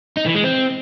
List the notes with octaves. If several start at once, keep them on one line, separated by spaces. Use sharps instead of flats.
D#4
E3
G#3
C4